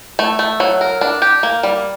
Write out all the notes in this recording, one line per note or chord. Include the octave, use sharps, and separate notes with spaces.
A3
A3
F#3
A#4
D4
G4
A#3
G3